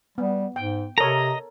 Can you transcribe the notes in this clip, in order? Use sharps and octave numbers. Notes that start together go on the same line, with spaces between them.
G3 B3
G#2 G5
C3 A4 A#4 C#5 D#5 A#5